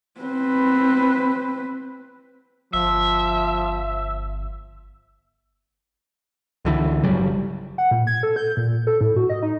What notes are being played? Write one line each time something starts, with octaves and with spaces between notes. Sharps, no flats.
C4 B4
G1 F3 E5
C#2 D3 E3
G1 C#3 F#3 G3
F#5
A#2
G#6
A4
G6
A#2
A4
A2
F#4
D#5
D#4